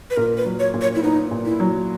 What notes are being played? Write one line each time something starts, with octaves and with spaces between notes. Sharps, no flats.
B4
A#2 A#4
B4
F#3
C#5
A#2
C#5
E4
B3 D#4
A#2
E4
F#3